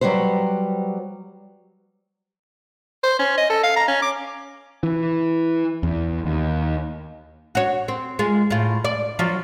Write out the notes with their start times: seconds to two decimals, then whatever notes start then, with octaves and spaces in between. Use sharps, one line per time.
0.01 F#3 G3 F#4 B4 C5
3.04 C5
3.19 C#4
3.37 D#5
3.50 A4
3.63 F5
3.76 A#5
3.88 C#4
4.02 D6
4.83 E3
5.83 E2
6.24 D#2
7.55 F#4 C#5
7.88 C4
8.19 G#3 F4
8.50 A2 F4
8.85 D5
9.19 F3 F#3 F4